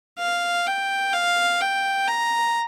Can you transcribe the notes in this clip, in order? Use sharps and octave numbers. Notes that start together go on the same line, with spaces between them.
F5
G5
F5
G5
A#5